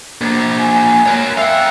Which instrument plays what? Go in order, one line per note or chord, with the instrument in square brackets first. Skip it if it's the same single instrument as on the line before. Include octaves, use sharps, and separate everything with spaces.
[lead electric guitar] A#3 D4
[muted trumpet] G#5
[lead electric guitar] A#4 C#5
[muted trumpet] E5 [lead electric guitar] F5 G5